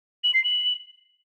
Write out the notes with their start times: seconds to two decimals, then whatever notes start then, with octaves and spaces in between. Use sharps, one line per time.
0.24 F#7
0.34 C7
0.44 F#7